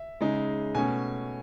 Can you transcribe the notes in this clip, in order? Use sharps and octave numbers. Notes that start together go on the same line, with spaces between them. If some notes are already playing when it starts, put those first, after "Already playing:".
Already playing: E5
C#3 G#3 D#4
B2 A3 C#4 G#5